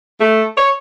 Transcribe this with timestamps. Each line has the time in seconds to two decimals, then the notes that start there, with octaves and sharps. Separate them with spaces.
0.21 A3
0.58 C#5